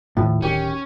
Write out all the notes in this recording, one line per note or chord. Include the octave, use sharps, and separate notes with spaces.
D#2 A2 F3
D1 D#3 C#4 G4